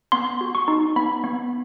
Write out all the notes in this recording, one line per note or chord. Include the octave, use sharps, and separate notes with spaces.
B3 C6
F#4
C#6
D#4
B3 B5
B3